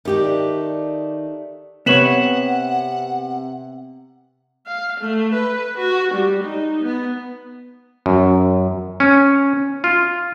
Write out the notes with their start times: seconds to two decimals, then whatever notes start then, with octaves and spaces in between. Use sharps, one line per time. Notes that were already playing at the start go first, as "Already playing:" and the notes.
0.05 D#3 A3 D4 G4
1.86 C3 B3 B4 C#5 F#5 B6 E7 F#7
4.67 F5
5.00 A3
5.34 B4
5.78 F#4
6.14 G3
6.44 D#4
6.84 B3
8.06 F#2
9.00 C#4
9.84 F4